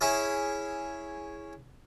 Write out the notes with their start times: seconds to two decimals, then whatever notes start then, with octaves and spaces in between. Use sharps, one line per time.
0.01 C#4 E4 G#4 E5